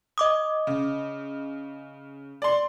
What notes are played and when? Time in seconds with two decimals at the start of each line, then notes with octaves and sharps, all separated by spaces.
0.18 D#5 D6 D#6
0.67 C#3
2.42 D5 C6